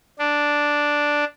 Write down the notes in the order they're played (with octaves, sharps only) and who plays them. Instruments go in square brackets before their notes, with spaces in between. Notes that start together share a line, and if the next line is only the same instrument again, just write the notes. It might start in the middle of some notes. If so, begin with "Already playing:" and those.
[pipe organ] D4